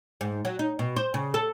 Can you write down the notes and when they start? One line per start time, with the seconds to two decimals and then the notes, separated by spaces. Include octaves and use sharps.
0.21 G#2
0.45 F#3
0.59 D#4
0.79 B2
0.96 C5
1.14 C#3
1.34 A4